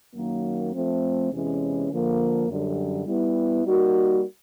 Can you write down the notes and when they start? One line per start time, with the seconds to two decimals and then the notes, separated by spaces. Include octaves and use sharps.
0.15 F#2 D#3 F#3 A#3
0.73 F3 A3 C4
1.32 E2 C3 E3 G#3 C#4
1.89 D3 F3 A#3
2.48 F#2 D3 G3
3.06 G3 B3 E4
3.64 G3 A#3 D#4 F#4 A#4